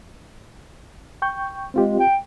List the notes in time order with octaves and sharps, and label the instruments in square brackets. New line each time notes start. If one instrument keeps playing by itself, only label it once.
[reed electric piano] G5 C#6 G6
[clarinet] G#3 [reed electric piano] C4 F4 G4
[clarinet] G5